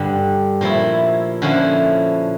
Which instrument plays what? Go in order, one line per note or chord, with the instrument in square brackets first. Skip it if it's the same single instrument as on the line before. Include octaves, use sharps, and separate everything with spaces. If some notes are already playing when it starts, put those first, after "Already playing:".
Already playing: [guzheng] G2 D3 G3
A#2 F3 A3 E4
D3 F3 C#4 E4